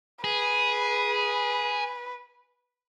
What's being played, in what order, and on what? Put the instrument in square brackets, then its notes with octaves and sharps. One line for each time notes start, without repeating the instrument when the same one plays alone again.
[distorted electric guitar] G#4 [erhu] B4